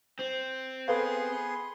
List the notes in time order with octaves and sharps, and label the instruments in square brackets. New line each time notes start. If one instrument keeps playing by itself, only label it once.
[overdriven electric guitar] C4
[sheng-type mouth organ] B3 G#4 C6 [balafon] A4 B4 F5